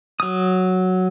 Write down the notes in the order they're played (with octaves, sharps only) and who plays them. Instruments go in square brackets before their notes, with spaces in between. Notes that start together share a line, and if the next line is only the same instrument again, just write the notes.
[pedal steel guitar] F#3 D#6